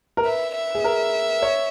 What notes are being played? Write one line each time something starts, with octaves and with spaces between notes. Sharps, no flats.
A#4
B4 E5
E5
G#4
A#4
C#5